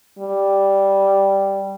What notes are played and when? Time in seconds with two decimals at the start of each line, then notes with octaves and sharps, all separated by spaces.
0.19 G3